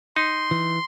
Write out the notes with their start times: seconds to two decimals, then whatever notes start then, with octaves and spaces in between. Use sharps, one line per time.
0.16 D#4 C6
0.51 E3